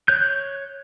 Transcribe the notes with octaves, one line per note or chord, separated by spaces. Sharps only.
C#5 F#6 G6